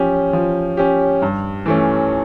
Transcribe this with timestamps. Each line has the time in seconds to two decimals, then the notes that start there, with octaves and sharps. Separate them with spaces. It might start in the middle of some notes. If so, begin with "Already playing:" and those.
Already playing: F3 C#4 G4
0.33 F3
0.77 C#4 G4
1.22 G2
1.66 E3 A3 C#4